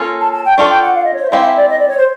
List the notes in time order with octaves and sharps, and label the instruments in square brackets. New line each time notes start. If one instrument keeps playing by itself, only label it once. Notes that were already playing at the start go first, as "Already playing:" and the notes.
Already playing: [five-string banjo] A#3 C#4 F4 A4
[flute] A5
A5
G5
[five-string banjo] D4 F4 A4 D5 [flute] C#6
[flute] G5
F#5
F5
D#5
C#5
C5
E5
[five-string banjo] G#3 C4 E4 G4 [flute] F5
[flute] E5
D5
D#5
D5
C#5
C5